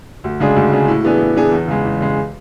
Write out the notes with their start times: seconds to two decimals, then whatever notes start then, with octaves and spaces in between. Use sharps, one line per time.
0.24 D2
0.40 C#3 G#3 D4 G#4
0.56 D2
0.72 C#3 G#3 D4 G#4
0.88 A2
1.04 E3 B3 D4 G#4
1.20 A2
1.36 E3 B3 D4 G#4
1.52 E2
1.68 C#3 G#3
1.84 E2
2.00 C#3 G#3